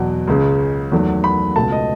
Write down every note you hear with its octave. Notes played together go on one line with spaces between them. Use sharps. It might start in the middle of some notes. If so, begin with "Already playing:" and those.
Already playing: E2 B2 F#3
C#2 C#3 G#3
E2 D#3 F#3 A3
B5
C#2 B2 A3 A5
D#5